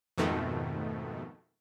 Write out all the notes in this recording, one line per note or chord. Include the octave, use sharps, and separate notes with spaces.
F2 G#2 B2 D#3 A3